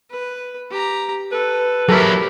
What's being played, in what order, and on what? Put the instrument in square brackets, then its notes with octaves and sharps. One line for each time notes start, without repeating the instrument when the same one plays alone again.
[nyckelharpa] B4
G4 A#5
[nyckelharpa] A4 [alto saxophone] B4
[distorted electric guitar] F#3 E4 [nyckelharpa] G4 [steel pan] A4 A#4